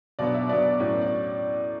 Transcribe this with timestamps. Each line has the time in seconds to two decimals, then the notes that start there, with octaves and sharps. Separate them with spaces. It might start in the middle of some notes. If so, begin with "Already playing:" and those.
0.19 B2 F#3 B3 D4 D5
0.34 E5
0.49 B2 F#3 B3 D4 D5
0.80 A2 F#3 C#4
1.01 D5